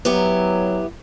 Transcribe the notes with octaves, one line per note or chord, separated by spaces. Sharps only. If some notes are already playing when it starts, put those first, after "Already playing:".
F#3 B3 E4 G4